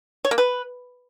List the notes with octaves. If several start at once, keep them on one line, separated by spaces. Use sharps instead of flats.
C#5
A#3
B4